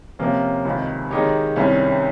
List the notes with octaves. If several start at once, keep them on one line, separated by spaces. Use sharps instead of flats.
C3 F3 A#3 C#4 F4
C#2 C3 D#3
D#3 G#3 D#4 G4 C#5
C2 C3 D#3 G3 C#4